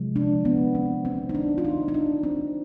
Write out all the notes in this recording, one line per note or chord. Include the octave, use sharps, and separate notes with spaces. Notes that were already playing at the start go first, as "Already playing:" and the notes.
Already playing: C3 F3 G#3
D4
B3
C4
C4
D#4
D4
F4
D#4
D#4
D4
C4